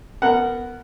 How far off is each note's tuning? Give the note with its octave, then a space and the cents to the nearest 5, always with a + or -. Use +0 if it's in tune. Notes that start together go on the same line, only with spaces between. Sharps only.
B3 +0 A#4 -20 F#5 +0